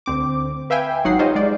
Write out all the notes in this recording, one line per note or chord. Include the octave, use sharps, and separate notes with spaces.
D2 C4 D6
B4 E5 F5 G5 G#5
G#1 F#3 D#4 F4 F#5 C7
D#4 F4 G4 C5 C#5 D#5
G#3 D5